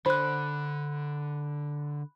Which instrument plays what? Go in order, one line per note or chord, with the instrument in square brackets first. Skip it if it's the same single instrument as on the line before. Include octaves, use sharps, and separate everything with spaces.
[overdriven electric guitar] D3 [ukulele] C5 [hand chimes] B5 F#6